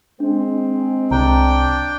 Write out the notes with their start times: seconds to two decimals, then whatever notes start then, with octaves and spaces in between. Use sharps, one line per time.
0.20 G#3 C4 D4
1.11 C2 D4 G5 A#5